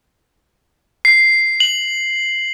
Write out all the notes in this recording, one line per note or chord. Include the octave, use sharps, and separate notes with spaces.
C7
F#7